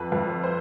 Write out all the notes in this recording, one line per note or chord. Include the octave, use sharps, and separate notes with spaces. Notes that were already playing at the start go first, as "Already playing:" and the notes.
Already playing: F2 B4
F2 B4
C5